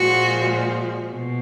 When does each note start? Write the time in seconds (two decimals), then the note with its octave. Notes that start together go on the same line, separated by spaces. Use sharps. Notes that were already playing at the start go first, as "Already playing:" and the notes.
Already playing: A#2 F3 G#3 F#4
1.11 B2